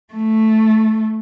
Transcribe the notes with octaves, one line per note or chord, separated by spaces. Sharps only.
A3